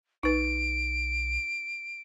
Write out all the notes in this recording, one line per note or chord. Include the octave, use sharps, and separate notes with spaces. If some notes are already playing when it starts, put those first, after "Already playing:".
B1 D#4 B4 D7